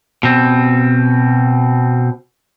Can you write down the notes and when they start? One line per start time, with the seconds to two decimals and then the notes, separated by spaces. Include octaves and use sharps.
0.23 B2 C4